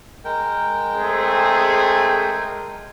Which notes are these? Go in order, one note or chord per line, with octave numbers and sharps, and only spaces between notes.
G#3 A#4 G5
A3 C4 G#4